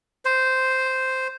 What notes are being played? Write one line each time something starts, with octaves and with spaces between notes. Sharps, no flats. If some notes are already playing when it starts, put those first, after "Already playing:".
C5